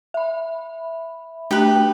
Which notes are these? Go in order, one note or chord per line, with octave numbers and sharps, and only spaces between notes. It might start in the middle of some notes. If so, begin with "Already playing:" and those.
E5 B5
A3 D4 F#4 G4 B4